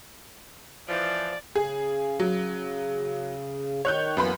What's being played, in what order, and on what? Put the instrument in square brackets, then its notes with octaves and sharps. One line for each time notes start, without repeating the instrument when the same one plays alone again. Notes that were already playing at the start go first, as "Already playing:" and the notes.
[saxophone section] E3 F3 [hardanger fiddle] D5
[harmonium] C#3 [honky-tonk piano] G#4
[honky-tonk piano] F#3
[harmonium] D#3 [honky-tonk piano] C#5 F#6 G6
[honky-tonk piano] F#2 B4 B5 [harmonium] E3 A#3 B3